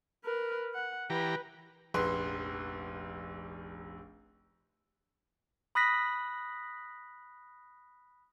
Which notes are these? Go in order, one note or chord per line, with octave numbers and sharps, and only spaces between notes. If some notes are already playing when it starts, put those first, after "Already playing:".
A#4 B4
F#5
E3 G4 B4 A#5
F1 A#1 B4 C6
B5 D#6 F#6 A#6 B6